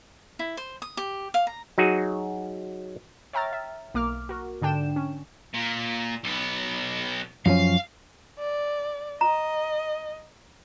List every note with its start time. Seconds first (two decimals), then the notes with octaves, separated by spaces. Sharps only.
0.39 E4
0.57 C5
0.82 D#6
0.97 G4
1.34 F5
1.47 A#5
1.78 F#3 D#4 F#4 G#4
3.33 C#5 E5 G5 A#5 F6 A6
3.53 E5
3.94 B1 A#3 D6 F6
4.29 F#4 A#4
4.62 G#2 D3 D4 G5 E7
4.96 C#4
5.54 A#2
6.24 B1 B3
7.46 F#2 F3 C#4 F5
8.39 D5
9.21 D#5 A#5